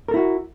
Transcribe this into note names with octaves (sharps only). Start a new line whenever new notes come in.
E4 F#4 A4 A#4